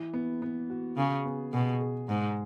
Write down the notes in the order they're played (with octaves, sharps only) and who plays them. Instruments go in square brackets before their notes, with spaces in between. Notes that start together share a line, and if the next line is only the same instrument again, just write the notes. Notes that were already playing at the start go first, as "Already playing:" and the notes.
Already playing: [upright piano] E3
B3
B3
F#4
[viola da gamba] C#3 [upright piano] G#4
[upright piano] B3
[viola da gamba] B2 [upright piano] G#4
[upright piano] G#4
[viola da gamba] G#2 [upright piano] G#3